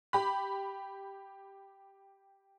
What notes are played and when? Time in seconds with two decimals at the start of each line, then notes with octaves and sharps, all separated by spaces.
0.13 G4 B5